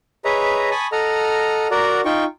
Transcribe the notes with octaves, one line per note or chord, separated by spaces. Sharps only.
G#4 B4 C#5 D#5 E5 A#5
G#5 A5 B5 C#6 D#6
A4 D#5 F#5 A#5 F6
F#4 A#4 D5 F#5 A#5
D#4 F4 G5 C#6